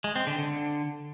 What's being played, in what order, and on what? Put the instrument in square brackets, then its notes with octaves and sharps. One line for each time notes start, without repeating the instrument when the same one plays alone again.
[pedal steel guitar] G#3
C4
D3
D3